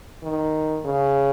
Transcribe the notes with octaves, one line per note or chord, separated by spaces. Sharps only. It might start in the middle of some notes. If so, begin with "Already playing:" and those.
D#3
C#3